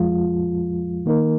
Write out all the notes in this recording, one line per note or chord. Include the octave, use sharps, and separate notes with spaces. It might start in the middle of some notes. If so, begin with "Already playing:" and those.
Already playing: F2 F3 G#3 F4
D#3 A#3 D#4 A#4